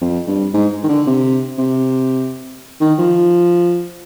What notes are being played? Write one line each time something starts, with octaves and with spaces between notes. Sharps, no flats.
F2
G2
G#2
D#3
D3
C3
C3
D#3
F3